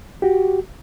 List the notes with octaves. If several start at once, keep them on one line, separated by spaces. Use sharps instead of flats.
F#4 G4